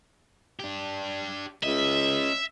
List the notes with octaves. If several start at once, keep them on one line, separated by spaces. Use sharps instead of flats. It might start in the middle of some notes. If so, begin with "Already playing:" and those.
D4 G4
C#2 C#4 D#5 E5